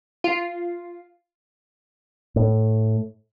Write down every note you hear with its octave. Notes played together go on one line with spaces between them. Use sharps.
F4
A2